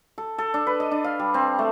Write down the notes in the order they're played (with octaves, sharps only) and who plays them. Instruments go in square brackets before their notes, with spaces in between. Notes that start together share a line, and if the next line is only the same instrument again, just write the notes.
[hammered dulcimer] A4
A4
D4
B4
D#5
D4
F5
G3
C4
A3